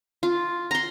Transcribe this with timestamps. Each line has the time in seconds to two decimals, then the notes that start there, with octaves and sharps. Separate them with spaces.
0.23 F4
0.71 A#5 C6